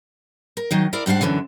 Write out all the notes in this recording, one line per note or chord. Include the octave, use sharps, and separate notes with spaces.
A#4
D#3 F#3 D#4
E4 A#4 D5 F5
G#2 G3 D4 F5 F#5
F#2 B2 D3 E3 F#3